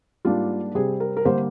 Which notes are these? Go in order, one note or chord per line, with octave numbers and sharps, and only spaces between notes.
G#2 G3 A#3 D4 F4
C3 G3 C4 G#4
A#4
A#4
D3 G3 A#3 C5